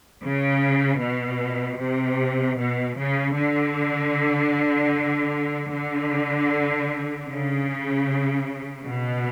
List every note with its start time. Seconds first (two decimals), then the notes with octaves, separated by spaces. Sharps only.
0.24 C#3
1.01 B2
1.80 C3
2.59 B2
2.98 C#3
3.36 D3
5.72 D3
7.28 C#3
8.85 B2